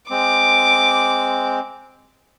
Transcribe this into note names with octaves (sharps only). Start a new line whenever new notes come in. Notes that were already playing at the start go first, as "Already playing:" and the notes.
G#3 C4 D6